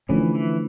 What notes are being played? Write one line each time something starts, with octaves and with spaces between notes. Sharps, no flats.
D3 E3 F3 A3 C#4
E3